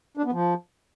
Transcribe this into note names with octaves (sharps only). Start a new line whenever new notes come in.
D4
B3
F3